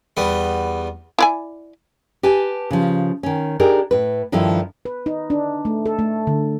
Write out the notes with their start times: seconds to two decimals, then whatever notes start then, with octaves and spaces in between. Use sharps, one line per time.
0.17 E2 G3 B3
1.19 E4 D5 G#5
2.23 G4 B4 G#5 A5
2.71 C#3 F3
3.23 D#3 C#4
3.60 D4 D#4 G4 G#4 A#4
3.91 A2 B4
4.32 G2 D#3 F3 E4 A4
4.85 B4
5.06 D#4
5.30 D4
5.65 A3
5.86 A4
5.99 A3
6.27 D3